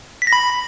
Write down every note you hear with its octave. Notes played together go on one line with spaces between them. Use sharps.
B6
A#6
B5